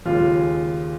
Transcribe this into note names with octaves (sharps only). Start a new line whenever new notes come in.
D#2 C#3 G#3 F4